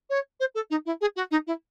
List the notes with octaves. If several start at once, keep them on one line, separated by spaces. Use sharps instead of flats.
C#5
C5
A4
D#4
E4
G#4
F#4
D#4
E4